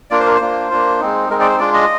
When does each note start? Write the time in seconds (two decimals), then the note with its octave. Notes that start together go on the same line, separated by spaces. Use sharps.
0.11 A#3 D4 F4 D5
0.20 C5
0.27 A#4
0.35 C5
0.41 A#3 D4 F4
0.71 A#3 D4 F4
1.00 G#3 C4 D#4
1.29 G#3 C4 D#4 A#4
1.40 D5
1.49 C5
1.59 G#3 D4 F4 D5
1.74 D#5